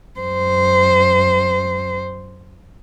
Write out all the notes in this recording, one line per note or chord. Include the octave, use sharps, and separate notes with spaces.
F#2 C5